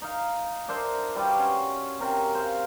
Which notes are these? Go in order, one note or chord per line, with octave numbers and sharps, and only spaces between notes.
D#4 F5
D4 A#4 C5 E5
G3 F4 F#4 B4
C#4 C6
C3 A#4 C#5 C6
C5 F5